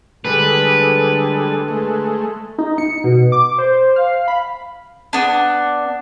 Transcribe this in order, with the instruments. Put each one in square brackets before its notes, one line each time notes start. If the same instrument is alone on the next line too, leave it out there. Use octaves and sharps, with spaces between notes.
[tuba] D3 [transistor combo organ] G3 G#3 A4 [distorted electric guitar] B4
[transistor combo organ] G#3 A3
[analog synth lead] D#4
C#7
B2
D6
C5
F5
B5
[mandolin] B3 D4